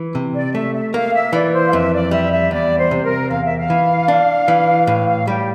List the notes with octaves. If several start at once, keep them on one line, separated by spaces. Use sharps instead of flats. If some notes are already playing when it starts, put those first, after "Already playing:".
Already playing: E3
C3
D5
A3 E5
E5
A#3 F5
E5
E3 D5
C5
F5
F2 E5
D5
G3 E5
E5
E2 D5
C5
C3
A#4
E2 F5
E5
F5
E3
D4
E3
A2 F5
F5
G3 G4